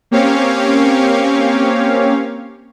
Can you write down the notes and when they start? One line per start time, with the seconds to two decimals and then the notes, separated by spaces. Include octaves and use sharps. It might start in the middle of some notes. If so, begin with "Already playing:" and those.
0.11 A#3 C4 C#4 G4 C#5 F5